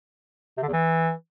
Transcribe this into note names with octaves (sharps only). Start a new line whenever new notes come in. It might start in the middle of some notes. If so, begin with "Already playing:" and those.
C3
D3
E2
E3